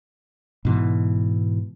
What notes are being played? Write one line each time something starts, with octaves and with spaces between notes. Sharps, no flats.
G#2 B2 E3